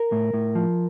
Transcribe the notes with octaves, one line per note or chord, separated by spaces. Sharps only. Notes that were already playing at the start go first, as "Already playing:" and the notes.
Already playing: A#4
A2
A2
F3